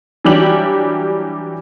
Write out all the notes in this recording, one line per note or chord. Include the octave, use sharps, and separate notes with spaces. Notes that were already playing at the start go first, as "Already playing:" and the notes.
E3 F#3 G3 D4 G4 F#7